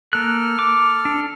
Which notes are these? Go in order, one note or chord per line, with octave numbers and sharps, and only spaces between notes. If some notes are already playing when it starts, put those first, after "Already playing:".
A#3 A4 F6 F#6
D6
D4